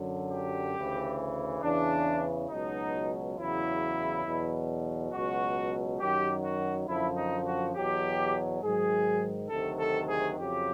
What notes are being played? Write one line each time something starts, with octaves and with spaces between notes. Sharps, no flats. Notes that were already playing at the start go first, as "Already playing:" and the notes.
Already playing: F#2 D3 F#3
G4
D2 C#3 E3
E2 C#3 E3 D4
C#2 B2 F#3 D#4
E2 C#3 F#3 E4
E2 B2 F#3
C#2 B2 F#3 F#4
F#2 D#3 F#3 G4
F#4
F#2 D3 F3 E4
D#4
F#4
E2 B2 F#3 G4
G#2 D#3 F#3 G#4
D2 C3 D#3 F#3 A4
A4
G#4
F2 C#3 F#3 G4